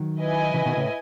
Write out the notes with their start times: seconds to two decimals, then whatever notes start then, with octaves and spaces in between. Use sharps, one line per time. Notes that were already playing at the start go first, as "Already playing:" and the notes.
Already playing: D#3 F#3
0.20 E4 B4 D#5 G#5
0.54 C#3 E3
0.66 B2 D#3
0.77 A2 C#3